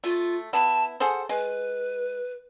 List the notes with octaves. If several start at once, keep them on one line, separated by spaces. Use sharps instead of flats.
A3 F4
B3 E4 A5
G#4 A4 C5 F#5
G#3 B4